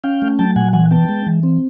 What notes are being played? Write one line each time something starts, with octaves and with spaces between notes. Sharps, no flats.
C#4 F5 G5
A3
F#3 G5 A5
A#2 F#5 G#5
E3 F#5 G#5
B3 G5 A5
G#3
E3
C4